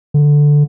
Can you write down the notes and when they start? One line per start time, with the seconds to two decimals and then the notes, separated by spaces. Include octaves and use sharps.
0.14 D3